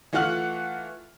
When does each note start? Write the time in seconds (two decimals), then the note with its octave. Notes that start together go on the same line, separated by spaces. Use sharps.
0.13 E3 A3 F4 F#5 F6 F#7